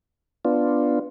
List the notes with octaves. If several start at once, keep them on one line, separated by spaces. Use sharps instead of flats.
B3 D4 F4